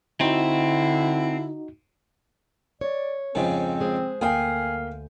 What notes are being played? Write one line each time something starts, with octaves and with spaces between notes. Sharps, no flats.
D3 C4 D#4 E4 F#4
C#5 D5
F2 G#2 C#3 C4
G#3 G#4 C5
D2 A#3 G#4 F5 G5 G#5